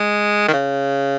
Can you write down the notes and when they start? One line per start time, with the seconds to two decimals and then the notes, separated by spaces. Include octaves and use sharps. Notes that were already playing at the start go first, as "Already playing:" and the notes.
Already playing: G#3
0.48 D#3
0.53 C#3